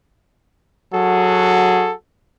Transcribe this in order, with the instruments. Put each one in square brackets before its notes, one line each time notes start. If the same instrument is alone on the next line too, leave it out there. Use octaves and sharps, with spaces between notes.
[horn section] F#3 F#4 G#4 A4